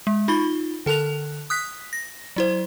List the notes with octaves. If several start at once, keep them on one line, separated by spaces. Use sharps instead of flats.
G#3
D#4 F4 B5 A6 G7
D3 A4 A5 F#6 F7
D#6 F#6 B6
A#6
F#3 E4 C5